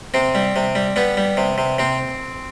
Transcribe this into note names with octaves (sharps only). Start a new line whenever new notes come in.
C3 C4
G3
C3
G3
G3 B3
G3
C3
C3
C3 C4